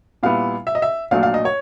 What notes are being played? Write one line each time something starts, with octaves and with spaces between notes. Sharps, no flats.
A#2 G3 B3 E4 F5
E5
D#5
E5
A#1 A#2 F#3 A3 D4 F5
F5
D#5
C#5